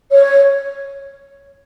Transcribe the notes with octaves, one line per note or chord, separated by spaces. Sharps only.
C#5